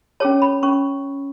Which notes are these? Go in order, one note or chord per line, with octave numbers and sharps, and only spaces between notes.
C#4 G#4 C#5 A5
B5
C#4 C#6